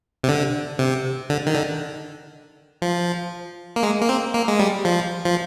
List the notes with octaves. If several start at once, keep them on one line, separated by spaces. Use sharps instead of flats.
C3
D3
C3
D3
D#3
D3
F3
A#3
G#3
A#3
C4
A#3
G#3
G3
F3
F3